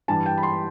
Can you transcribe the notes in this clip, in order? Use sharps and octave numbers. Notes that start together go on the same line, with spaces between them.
G2 E3 G3 A5
G5
B5
C6